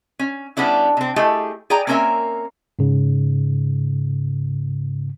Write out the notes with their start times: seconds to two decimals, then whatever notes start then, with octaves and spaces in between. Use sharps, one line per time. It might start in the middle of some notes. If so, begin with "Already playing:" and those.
0.19 C#4
0.57 G3 B3 C#4 D4 E4
0.97 C3 C4
1.16 A3 E4 G4 G#4 D#5
1.70 G#4 D5 G5 G#5 A#5
1.87 A#3 C4 C#4 A#4 C#5 E5
2.79 G#2 C#3